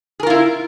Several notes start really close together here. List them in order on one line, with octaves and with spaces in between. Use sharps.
G#4 A#4 F4 E4